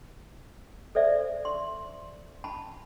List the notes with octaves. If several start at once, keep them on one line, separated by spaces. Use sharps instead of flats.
A4 C5 D5 E5
C6
A5 B5